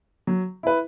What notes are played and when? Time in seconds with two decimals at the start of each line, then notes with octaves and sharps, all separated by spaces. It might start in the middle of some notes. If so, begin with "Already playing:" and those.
0.27 F#3
0.63 E4 B4